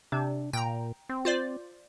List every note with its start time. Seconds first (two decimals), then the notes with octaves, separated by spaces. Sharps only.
0.12 C3 D4
0.53 A#2 G5 A#5
1.09 C4
1.25 F4 C5 D5